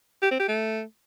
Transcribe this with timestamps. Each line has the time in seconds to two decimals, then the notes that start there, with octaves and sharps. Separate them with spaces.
0.22 G4
0.31 C4
0.39 G4
0.48 A3